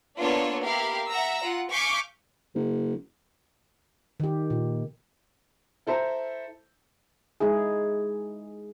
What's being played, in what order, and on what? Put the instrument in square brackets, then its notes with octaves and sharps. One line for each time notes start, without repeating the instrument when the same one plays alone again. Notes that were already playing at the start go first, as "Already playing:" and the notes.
[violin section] A#3 B3 D4 F4 A4 C#5
E4 G4 A#4 F5
E5 F#5 A#5 E6
F4 F#5
F5 G#5 C#6 D6 G6 B6
[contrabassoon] F#1
[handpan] D#3 G4
A#2
[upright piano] E4 A4 C5 E5 A5 A#5
[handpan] G#3 D#4 E4 G#4